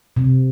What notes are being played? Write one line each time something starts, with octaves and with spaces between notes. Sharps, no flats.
C3